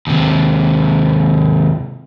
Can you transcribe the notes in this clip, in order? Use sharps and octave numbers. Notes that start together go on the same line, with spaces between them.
D#2 C3